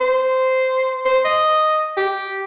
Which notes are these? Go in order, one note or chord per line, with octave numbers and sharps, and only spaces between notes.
C5
C5
D#5
G4